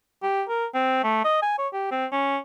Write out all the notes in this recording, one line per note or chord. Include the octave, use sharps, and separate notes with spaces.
G4
A#4
C4
A3
D#5
G#5
C#5
G4
C4
C#4